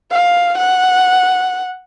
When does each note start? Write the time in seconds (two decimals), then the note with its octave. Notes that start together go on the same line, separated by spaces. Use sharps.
0.11 F5
0.58 F#5